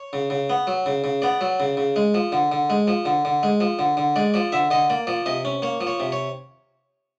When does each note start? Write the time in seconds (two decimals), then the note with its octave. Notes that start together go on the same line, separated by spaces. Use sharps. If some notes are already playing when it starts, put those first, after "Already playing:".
Already playing: C#5
0.13 C#3
0.30 C#3
0.50 B3
0.67 F#3
0.86 C#3
1.04 C#3
1.22 B3 D5
1.41 F#3
1.60 C#3
1.77 C#3
1.96 G#3
2.14 F3
2.32 D3
2.52 D3
2.70 G#3
2.87 F3
3.05 D3
3.25 D3
3.43 G#3
3.60 F3
3.79 D3
3.97 D3
4.16 G#3 D5
4.34 F3 D5
4.52 D3 E5
4.71 D3 D#5
4.90 A#3 D5
5.07 F3 D5
5.26 C3 D#5
5.45 C#4
5.62 A#3 C#5
5.81 F3
5.87 C#5
6.00 C3
6.12 C#5